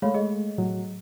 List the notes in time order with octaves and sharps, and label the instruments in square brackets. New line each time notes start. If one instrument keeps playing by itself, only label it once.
[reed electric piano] G#3 A3 [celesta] C#5 F5 B5
[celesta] G#4 D#5
[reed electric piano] A2 F#3